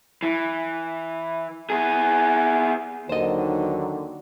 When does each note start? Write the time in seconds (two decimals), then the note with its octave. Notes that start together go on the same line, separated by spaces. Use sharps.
0.23 E3
1.70 B3 G#4
3.09 D#2 D3 D#3 F#3 C5 D#5